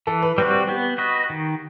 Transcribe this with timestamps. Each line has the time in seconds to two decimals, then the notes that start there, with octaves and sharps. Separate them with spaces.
0.07 E3 A4
0.22 B4
0.38 G3 C4 F#4 B4
0.53 B4
0.68 B3 G4
0.98 F#4 B4 D#5
1.30 D#3